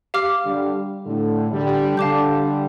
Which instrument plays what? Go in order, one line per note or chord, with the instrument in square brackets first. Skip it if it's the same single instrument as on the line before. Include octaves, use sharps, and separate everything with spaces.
[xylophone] G4 F5 D6 F6
[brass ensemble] D3 G3
A2 D3
D3 G3
[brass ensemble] D3 G3 [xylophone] F5 A5 D6 G6